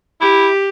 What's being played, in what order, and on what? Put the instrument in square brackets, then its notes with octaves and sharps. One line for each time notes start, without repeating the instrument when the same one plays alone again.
[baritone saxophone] E4 [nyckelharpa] G4